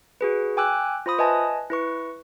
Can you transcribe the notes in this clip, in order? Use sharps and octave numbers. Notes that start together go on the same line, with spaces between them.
F#4 G#4 B4
G5 G#5 D6 E6 F#6
F4 C5 B5 D#6
B4 D#5 E5 G#5 A5
E4 B4 C#6